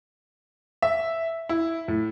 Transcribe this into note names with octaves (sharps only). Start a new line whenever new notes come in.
E5
E4
A2